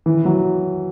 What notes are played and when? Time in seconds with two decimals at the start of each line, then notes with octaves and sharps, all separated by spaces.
0.06 E3
0.25 F#3